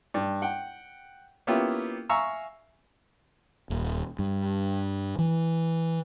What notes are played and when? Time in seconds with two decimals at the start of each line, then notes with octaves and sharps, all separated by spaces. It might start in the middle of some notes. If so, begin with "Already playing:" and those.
0.14 G2
0.42 F#5 G5
1.47 A#3 B3 C#4 E4 F4 G4
2.09 E5 F5 G#5 A#5 C#6 E6
3.70 D#1
4.19 G2
5.19 E3